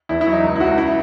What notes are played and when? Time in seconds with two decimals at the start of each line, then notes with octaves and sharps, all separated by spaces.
0.09 E2 E4
0.21 E4
0.27 F#3
0.32 D#4
0.44 C#2
0.56 E4
0.60 C#2 F#4
0.78 E4